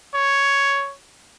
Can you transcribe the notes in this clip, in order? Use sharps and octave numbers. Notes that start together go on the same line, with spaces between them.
C#5